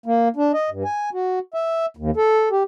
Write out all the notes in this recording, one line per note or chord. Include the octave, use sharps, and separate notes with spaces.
A#3
D4
D#5
G2
G#5
F#4
E5
D#2
A4
G4